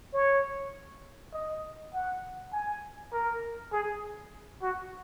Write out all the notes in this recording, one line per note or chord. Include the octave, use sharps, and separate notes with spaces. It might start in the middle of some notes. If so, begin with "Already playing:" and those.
C#5
D#5
F#5
G#5
A#4
G#4
F#4